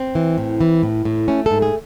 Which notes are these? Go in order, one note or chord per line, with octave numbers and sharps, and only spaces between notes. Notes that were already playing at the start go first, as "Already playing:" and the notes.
Already playing: C4
E3
A2
E3
A2
A2
A3 C#4
A4
G#2
G#4